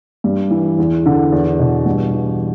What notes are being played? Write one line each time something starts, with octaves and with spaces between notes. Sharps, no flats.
G2
E3
E2
D3
E2
B2
G2
E3